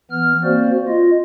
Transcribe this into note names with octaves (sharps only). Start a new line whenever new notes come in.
E3 B3 F6
A#3 C4 F#4 C5 D5
F4 D#5